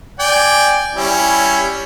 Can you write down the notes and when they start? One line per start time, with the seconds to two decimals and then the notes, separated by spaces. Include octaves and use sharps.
0.19 D5 G5 G#5
0.95 G3 C#4 E4